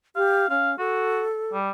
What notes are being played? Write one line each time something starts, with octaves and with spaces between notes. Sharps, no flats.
G4 F5
C#4 F5
F#4 A4
G3